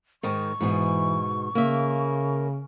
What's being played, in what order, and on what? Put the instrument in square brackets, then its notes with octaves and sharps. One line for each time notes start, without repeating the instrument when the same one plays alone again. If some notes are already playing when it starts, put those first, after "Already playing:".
[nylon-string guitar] G#2 D#3 [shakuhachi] C#6
[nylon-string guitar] G#2 B2 [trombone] E3
[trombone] C#3 [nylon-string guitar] A#3 E5